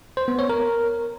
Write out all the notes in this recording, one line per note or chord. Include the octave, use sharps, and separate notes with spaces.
C5
B3
C#5
A#4